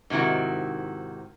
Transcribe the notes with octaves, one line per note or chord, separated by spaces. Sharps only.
G#2 C3 D#3 E4 F#4